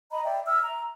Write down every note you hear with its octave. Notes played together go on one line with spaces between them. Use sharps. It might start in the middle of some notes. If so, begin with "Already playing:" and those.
D#5 A#5 B5
D5 E5 G5
E5 E6 F6
A#5